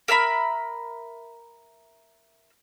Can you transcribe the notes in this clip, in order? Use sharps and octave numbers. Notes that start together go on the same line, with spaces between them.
A#4 E5 A#5 B5